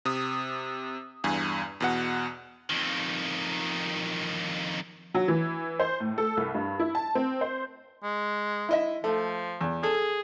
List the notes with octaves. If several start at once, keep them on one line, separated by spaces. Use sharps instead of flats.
C3 D#6
E2 G2 G#5
E2 B2 F#5
F2 D#3
F#3
E3
C5
A2
A4
C2
G2
E4
A5
C4
C5
G#3
E4 D#5 E5
F3 A3
E2
G#4 A4